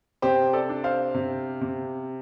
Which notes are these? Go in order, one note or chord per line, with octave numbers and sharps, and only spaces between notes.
C3 G4 C5
A4 D5
D4
C5 F5
C3
C3